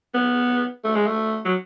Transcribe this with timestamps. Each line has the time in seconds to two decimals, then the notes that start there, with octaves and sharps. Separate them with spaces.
0.15 B3
0.84 A3
0.95 G#3
1.07 A3
1.45 F#3